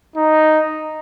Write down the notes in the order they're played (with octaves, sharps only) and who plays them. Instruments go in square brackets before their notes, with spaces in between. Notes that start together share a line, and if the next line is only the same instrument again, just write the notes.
[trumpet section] D#4